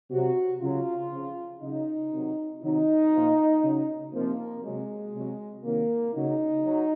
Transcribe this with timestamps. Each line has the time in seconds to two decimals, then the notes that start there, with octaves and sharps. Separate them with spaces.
0.11 C3 F#3 F#4
0.61 C#3 F#3 F4
1.11 C#3 F3
1.61 C#3 F#3 D#4
2.11 C3 D#3 F#3
2.62 C3 D#3 F#3 D#4
3.13 A#2 F3
3.63 C#3 F#3
4.13 C3 F3 A#3
4.63 C3 F#3 G#3
5.14 C3 F#3
5.64 C3 D#3 F#3 A#3
6.14 C#3 F#3 D#4
6.65 F#3